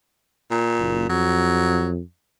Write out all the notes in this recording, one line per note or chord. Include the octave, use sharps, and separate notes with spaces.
A#2
F#1
F2 F#3